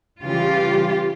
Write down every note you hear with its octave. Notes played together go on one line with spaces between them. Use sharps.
C#3 E3 G3 F4 G4